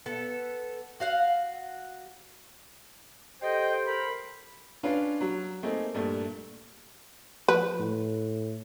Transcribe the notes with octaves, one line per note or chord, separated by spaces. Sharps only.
B3 A4
F#4 F5 F#5
G4 A4 C5 D#5 G5
A#4 B5
C#4 D4 F4 B4 F5
F#3
A3 A#3 C4 D#4 G#4
G2 A#2 A3
F3 B4
A2